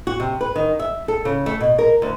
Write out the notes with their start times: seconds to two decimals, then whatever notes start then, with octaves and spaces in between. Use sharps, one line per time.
0.07 F#4
0.20 C3
0.41 B4
0.56 D#3
0.79 E5
1.08 A4
1.25 C#3
1.46 A3
1.60 B2
1.79 A#4
2.02 D2